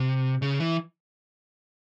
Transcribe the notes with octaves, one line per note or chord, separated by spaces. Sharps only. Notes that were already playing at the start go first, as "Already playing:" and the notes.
Already playing: C3
C#3
E3